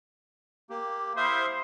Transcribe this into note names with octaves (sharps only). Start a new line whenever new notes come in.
A#3 G4
E4 C5 E5 F5 D#6